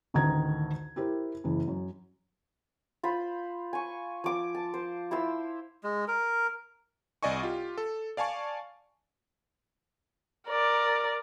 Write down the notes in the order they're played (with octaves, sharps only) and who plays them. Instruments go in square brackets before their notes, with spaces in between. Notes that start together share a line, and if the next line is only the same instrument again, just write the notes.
[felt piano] A1 D2 D#3 A#5 G#6
E4 G4 A#4 C5
F#1 E3
F#2
[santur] F4 C5 B5
G#5 C#6
F3 D6
A5
C5
E4 C5 F5 E6
[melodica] G#3
A#4
[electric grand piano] C2 D5 D#5 G#5 C#6
F4 G4
A4
D5 F5 G#5 A5 C#6
[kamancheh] A#4 D5